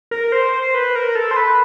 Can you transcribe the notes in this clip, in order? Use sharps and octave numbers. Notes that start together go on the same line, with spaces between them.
A#4
C5
C5
B4
A#4
A4
C5
B4